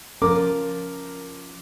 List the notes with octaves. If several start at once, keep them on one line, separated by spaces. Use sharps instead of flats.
F3 C#4 F4 A#4 D6